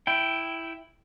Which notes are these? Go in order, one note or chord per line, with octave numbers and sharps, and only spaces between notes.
E4 G5